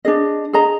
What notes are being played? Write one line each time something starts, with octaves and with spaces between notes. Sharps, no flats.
D4 G#4 D#5
G#4 D#5 A#5